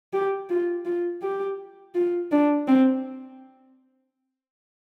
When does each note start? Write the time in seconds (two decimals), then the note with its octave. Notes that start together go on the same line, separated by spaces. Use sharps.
0.13 G4
0.50 F4
0.85 F4
1.22 G4
1.95 F4
2.32 D4
2.68 C4